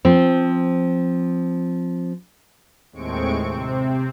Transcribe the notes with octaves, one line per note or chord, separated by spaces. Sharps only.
F3 C4
D#2 A2 G#3 C4 C#6 D7
C3 C4